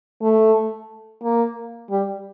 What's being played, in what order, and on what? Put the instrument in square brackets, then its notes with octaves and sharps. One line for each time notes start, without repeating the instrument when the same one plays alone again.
[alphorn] A3
A#3
G3